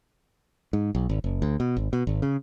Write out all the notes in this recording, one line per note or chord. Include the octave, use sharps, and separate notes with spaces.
G#2
B1
G#1
F#1
D2
B2
G#1
B2
G#1
C#3